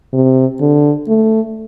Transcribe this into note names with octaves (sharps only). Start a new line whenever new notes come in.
C3
D3
A3